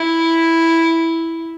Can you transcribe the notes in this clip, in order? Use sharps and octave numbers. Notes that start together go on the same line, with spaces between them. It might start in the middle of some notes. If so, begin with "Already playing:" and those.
Already playing: E4